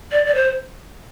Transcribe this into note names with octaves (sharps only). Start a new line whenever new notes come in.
D5
D5
C5